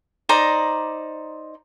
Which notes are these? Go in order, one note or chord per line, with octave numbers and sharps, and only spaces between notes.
D#4 C5 D5 A#5